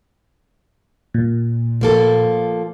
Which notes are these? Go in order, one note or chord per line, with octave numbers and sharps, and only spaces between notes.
A#2
F3 A#3 A4